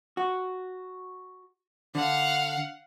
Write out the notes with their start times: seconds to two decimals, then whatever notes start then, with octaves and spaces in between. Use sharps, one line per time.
0.17 F#4
1.95 D3 F5 F#5